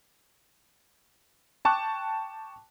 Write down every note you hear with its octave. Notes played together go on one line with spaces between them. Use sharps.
G5 A5 C#6 D6 F#6